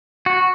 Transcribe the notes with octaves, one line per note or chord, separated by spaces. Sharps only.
F#4